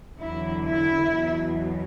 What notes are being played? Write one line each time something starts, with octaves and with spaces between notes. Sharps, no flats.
E2 D3 F#3 E4
E4
E2 B2 F#3